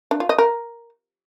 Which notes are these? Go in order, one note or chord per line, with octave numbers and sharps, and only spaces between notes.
D4
F4
D#5
A#4